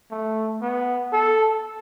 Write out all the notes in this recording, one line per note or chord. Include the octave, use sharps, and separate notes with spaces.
A3
B3
A4